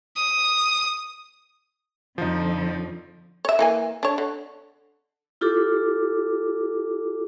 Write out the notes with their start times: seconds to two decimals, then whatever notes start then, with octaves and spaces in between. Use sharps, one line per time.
0.16 D#6
2.18 F2 D3 F3 D#4
3.45 C#5 E5
3.59 E3 A#3 G#5
4.03 D4 C#5
4.18 D3
5.41 E4 F4 G4 A4 D6